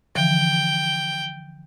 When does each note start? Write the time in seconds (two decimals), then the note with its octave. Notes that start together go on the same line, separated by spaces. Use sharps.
0.15 D3 E3 F3 G5